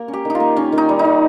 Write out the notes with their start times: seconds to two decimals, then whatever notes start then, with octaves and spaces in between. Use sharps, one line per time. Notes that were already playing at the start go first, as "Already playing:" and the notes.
Already playing: A#3 A#4
0.08 C#4
0.13 G4
0.25 D#3 D#4
0.35 F4
0.40 A#3
0.56 D#3 C#4
0.72 D#3
0.78 D#4
0.89 G3
0.99 D#4
1.05 D#3